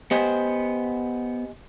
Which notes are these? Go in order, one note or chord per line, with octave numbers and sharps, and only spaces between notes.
B3 G4 C5 D#5 G#5